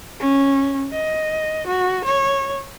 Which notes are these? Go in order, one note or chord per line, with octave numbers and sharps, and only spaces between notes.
C#4
D#5
F#4
C#5